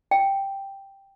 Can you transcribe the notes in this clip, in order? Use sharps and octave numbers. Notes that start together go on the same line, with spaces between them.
G5